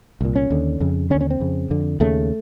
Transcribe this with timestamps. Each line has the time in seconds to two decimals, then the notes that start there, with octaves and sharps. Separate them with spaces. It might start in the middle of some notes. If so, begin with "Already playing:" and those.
0.21 C2 A#2
0.35 C#4
0.50 D#2 D3
0.80 F2 C#3
1.10 D3 C#4
1.15 D#2
1.21 C#4
1.30 C4
1.40 F2 C#3
1.70 F2 D3
2.00 D#2 C#3 A3